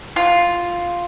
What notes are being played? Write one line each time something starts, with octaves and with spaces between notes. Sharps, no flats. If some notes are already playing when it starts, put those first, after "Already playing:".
F4